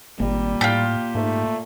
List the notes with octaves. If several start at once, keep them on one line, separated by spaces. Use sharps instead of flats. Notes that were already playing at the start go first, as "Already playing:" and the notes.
G#1 A#2 G3 A#3
A2 F4 G4
G#2 A3